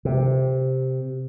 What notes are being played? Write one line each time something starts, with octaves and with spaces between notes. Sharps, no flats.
C3